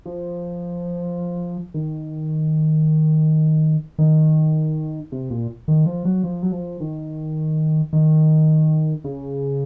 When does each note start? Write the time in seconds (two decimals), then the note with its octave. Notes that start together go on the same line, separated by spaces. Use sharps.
0.06 F3
1.74 D#3
3.98 D#3
5.12 C3
5.30 A#2
5.68 D#3
5.86 F3
6.05 F#3
6.24 F3
6.43 F#3
6.52 F3
6.80 D#3
7.93 D#3
9.04 C#3